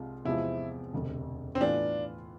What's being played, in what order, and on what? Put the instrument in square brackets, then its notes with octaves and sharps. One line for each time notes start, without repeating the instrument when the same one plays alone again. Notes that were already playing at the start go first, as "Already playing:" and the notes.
Already playing: [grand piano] C2 C3 G#3 F4
[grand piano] E2 C3 F3 G#3 C4 [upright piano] E4
[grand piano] E1 D2 C3
[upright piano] C4
[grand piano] A2 E3 B3 F4 [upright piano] D4